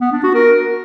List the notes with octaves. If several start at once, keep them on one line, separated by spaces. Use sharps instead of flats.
B3
D4
F#4
A#4